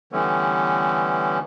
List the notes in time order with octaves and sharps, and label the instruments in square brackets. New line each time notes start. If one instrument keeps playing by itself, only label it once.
[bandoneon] D3 E3 G3 A3 B3 C#4